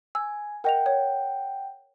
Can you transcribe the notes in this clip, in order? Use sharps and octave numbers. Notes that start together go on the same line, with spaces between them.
G#5 E6
A#4 D#5 F#5 G5 F7
C#5